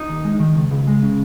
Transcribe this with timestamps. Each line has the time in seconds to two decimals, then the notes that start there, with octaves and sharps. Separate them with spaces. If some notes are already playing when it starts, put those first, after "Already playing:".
Already playing: D#4
0.09 D#2
0.25 G#3
0.40 D#3
0.55 C#2
0.71 C#2
0.87 G#3
1.03 C#3